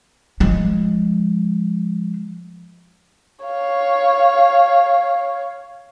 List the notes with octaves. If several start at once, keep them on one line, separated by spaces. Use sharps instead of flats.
F3 G#3
C#5 F5